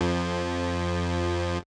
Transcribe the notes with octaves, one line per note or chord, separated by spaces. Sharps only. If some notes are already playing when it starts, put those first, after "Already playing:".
F2 F3